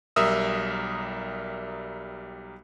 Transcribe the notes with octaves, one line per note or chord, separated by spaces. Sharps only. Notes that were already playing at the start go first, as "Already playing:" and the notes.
B1 G3 A#4 E5 D#6 E6